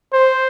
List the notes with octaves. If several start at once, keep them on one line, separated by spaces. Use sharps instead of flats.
C5